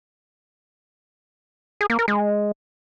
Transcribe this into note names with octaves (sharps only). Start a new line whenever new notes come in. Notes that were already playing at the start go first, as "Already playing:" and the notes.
G#4
A#3
A#4
G#3